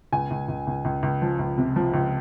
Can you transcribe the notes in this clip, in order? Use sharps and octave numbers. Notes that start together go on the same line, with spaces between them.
C#2 G#5
C#2
C#2
C#2
C#2
C#2
F3
C#2
C3
F3
C#2